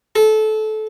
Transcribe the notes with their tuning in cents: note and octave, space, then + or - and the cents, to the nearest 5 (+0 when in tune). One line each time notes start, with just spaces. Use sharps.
A4 -25